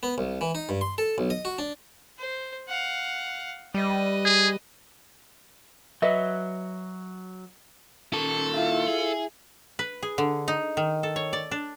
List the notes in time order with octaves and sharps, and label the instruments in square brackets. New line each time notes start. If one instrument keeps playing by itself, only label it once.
[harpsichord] B3
C2
E3
D#4
G2
C6
A4
B1
D#5
F#4
D4
[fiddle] C5
F5 F#5
[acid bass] G3 [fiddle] B4 D#5
[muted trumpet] G#4
[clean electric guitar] F#3 [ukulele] B4 D#5 E5
[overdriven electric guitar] A#2 D#3 [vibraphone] C#4 [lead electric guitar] A4
[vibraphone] E4 E5 [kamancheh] F4
[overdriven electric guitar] G#4
[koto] B4
G#4
D3
D#4
D#3
A4
C#5
D5
D4